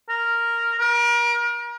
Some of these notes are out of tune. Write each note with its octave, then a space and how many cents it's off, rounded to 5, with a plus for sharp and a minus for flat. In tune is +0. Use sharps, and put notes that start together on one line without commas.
A#4 -5
A#4 +35